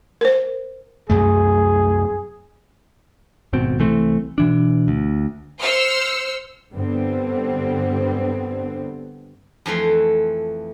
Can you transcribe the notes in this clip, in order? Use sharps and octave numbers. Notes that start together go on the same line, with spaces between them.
A#4 C5
C2 F#2 A3 G#4
D#1 G#1 B2 C4
C2 E3 A3 C4
B2 E3 D4
D2
C5 E6 F6 C#7
G2 D3 G3 B3 C4
F2 E3 A3 C6